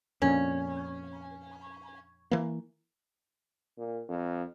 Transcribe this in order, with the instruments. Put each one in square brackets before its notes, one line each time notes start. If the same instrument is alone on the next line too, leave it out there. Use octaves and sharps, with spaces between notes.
[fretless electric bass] F2 A#2 [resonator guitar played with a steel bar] C#4
[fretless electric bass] E3 A#3
[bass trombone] A#2
F2